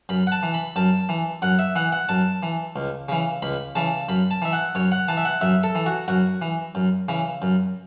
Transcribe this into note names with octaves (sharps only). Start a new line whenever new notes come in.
F#2 B5
F#5
A5
E3
B5
F#2 A5
E3
F#2 F#5
E5
E3 F#5
F#5
F#2 A5
E3
C#2
C#3 E3
C#2 B5
C#3 E3 A5
F#2 B5
A5
E3 E5
F#5
F#2 C#5
F#5
E3 A5
E5
F#5
F#2 E5
A4
E3
F#4
F#2 F#4
E3
F#2
C#3 E3
F#2